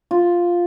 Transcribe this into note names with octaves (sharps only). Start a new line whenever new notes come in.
F4